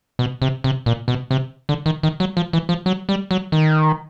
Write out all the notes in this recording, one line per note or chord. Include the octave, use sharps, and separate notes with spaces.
B2
C3
C3
A#2
B2
C3
D3
D#3
D#3
F#3
F3
E3
F3
F#3
G3
F#3
D#3